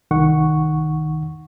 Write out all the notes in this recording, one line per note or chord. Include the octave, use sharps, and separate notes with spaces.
C2 D#3 F#5 C#6